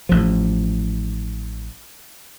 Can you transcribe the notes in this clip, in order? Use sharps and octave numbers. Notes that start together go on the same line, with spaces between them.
A1 F3